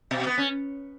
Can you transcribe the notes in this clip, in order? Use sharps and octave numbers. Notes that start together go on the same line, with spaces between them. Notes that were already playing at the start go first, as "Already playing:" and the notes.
B2
B3
C#4